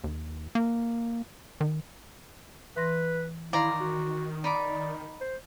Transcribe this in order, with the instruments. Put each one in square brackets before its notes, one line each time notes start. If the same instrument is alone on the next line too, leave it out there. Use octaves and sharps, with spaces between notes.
[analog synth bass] D#2
A#3
D#3
[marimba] E3 C6 A#6 [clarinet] B4
[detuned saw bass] D#3 [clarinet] E4 [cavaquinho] D5 A#5 C6 [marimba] F5
[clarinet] F#4
[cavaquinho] D#4 B5 D6 [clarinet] D5
[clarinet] C5